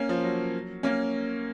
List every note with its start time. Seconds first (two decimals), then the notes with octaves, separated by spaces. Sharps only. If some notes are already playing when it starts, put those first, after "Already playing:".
Already playing: A#3 C#4
0.09 F3
0.24 F#3
0.83 A#3 C#4